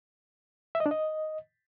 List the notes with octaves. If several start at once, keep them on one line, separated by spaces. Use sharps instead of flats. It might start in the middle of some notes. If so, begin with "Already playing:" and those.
E5
D#5
D4
D#5